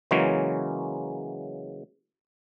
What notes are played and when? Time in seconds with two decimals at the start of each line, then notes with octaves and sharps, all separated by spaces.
0.11 C#3 E3 F#3 G#3 A#3 C#4